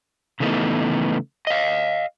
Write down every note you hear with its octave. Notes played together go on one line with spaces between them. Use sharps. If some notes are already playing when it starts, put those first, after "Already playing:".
C#3 E3 A3 B3 D#4
D#5 F5